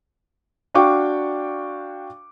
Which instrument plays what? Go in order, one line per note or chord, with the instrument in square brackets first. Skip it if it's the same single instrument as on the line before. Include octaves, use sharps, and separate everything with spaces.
[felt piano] D4 F#4 F5 G5 C#6 D6